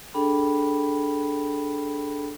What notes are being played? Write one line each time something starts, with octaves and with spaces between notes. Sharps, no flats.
D4 G#4 A4 G5 B5